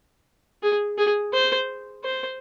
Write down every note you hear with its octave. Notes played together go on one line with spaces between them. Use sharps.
G#4
G#4
C5
C5